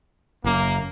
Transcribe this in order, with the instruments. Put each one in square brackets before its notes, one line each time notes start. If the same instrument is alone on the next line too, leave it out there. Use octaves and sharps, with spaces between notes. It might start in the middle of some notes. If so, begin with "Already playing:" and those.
[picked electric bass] F#1 F#2 [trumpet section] A#3